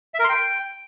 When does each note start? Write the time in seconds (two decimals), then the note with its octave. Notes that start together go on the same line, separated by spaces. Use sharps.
0.14 E5
0.19 A#4
0.24 C6
0.29 G5